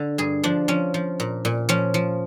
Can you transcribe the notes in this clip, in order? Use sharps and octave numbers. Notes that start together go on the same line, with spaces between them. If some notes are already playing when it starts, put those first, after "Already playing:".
Already playing: D3
G2 G#4
F3 D4
F3 C#4
F3
A#2
A#2
F3 C#4
F3